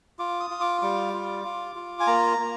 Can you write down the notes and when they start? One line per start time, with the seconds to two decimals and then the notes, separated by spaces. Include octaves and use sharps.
0.19 F4 D6
0.40 D#6
0.50 F4
0.61 D6
0.82 G3 D6
1.13 F4
1.44 F4
1.76 F4
2.00 G#5
2.07 A#3 A#5
2.39 A#3